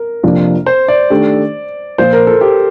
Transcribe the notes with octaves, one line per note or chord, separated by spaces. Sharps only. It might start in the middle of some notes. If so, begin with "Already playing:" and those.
Already playing: A#4
F2 C3 F3 A#3 D4
C5
D5
D#3 A3 D4 G4
A#2 F3 A#3 F4 C5
A#4
A4
G4